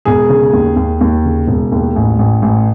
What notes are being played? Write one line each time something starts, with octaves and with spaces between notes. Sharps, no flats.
E1 G#4
C#3
D#2
D#2
D#2
C#3
E1
D#2
A1
A1
A1